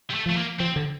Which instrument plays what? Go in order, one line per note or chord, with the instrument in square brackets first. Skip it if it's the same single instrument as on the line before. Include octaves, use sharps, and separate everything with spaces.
[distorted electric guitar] G3
A3
[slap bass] F3 [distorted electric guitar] A3
[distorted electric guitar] A#3
[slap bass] F3 [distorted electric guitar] C4
[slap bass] D3